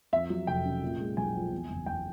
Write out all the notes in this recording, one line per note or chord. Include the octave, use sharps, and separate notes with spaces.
F2 E5
F#3
F1 G5
C#3
A#2
G#3
B1 G#5
F3
E2
F#1
F#1 G5